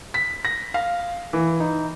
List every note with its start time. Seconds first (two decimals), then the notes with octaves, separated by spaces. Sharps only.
0.14 B6
0.45 A#6
0.74 F5
1.33 E3
1.60 D#4